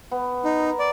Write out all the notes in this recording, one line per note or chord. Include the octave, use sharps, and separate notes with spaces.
B3
D#4
A#4
D5